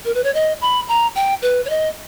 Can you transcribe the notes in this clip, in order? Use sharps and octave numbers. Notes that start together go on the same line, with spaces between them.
A#4
B4
C#5
D#5
B5
A#5
G5
B4
C#5
D#5